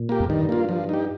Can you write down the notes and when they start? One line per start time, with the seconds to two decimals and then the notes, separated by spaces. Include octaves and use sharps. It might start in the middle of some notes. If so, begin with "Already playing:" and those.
Already playing: A#2
0.09 A#3 G4
0.20 F2
0.29 G2 D#3
0.49 A#3 F4
0.69 F3
0.89 D#4 G4